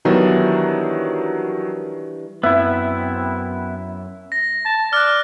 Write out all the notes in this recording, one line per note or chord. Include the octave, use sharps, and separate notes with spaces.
D#3 E3 F#3 G3 B3 D4
F#2 B3 C4 E4 E5
A#6
A5
D5 F6 F#6